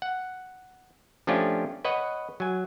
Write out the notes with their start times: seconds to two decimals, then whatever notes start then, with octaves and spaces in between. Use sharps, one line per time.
0.02 F#5
1.27 F3 A3 C#4 D4 F4 G4
1.85 B4 C#5 D#5 F#5
2.40 F#3 G#5